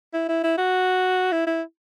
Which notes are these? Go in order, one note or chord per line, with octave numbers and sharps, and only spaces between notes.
E4
E4
E4
F#4
E4
E4